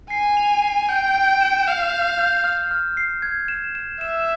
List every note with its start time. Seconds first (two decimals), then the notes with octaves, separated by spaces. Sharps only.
0.10 G#5 C7
0.37 F7
0.62 C7
0.89 G5 G6
1.15 G6
1.41 E7
1.67 F5 E7
1.93 G6
2.19 G6
2.44 F6
2.71 F6
2.97 C7
3.22 G#6
3.48 E7
3.75 E7
4.01 E5 E7